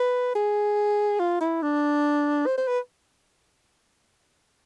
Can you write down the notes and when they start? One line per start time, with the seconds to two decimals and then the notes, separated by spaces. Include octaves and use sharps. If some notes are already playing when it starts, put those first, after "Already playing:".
Already playing: B4
0.35 G#4
1.19 F4
1.41 E4
1.62 D4
2.46 C5
2.57 C5
2.67 B4